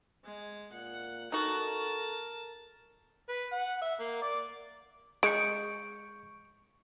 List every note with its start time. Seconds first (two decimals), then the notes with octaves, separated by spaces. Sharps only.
0.24 G#3
0.72 A#2 F#5
1.32 D#4 F#4 A4 A#4 A5
3.29 B4
3.52 F#5
3.82 E5
4.00 A#3
4.22 D5
5.23 G#3 C#6 G6 C#7 D7